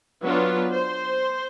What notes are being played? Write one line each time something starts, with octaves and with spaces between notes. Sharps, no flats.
F#3 B3 D4 F4 B4
C5